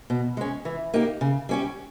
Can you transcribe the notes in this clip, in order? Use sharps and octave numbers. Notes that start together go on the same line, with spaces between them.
B2
G#3 C#4
E3
A#3 D#4 G4
C#3
G3 C#4 G4